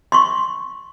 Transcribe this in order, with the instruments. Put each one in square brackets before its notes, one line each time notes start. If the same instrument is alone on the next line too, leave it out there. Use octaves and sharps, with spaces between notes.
[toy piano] C6 C#6